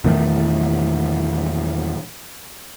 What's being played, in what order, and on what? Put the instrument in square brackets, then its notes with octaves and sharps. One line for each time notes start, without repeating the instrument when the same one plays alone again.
[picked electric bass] E2 A#2 D#3 A3